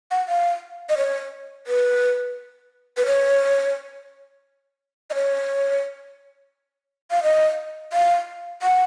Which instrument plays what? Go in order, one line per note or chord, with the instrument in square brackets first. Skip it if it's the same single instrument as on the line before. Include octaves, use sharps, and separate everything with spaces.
[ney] F#5
F5
D#5
C#5
B4
B4
C#5
D#5
C#5
F5
D#5
F5
F#5